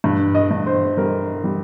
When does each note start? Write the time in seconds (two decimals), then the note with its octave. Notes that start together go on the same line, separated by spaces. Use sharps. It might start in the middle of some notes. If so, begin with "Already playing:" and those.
0.04 G2
0.35 D#5
0.51 G2
0.67 C5
0.97 G3 A#4
1.44 G3